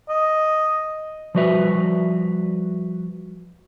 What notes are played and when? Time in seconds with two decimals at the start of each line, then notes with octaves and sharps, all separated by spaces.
0.09 D#5
1.35 F3 G3 F#4 B4 E5